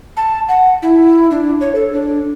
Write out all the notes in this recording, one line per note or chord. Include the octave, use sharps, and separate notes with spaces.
A5
F#5
E4
D4
C#5
A4
D4